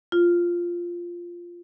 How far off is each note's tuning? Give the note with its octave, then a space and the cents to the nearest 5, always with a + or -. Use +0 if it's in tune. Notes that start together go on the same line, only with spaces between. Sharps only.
F4 -5